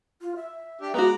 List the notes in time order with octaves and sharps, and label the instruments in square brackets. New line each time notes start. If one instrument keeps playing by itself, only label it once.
[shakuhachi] F4
E5
[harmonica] D4 G4
[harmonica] G#3 A#5 D6 [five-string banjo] B3 F#4